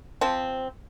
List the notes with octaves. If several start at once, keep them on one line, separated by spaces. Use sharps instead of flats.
F3 C4